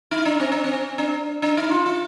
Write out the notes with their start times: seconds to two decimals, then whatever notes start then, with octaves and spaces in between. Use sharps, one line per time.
0.11 D#4
0.25 D4
0.40 C4
0.52 D4
0.64 C4
0.98 D4
1.42 D4
1.57 D#4
1.71 F4
1.86 F4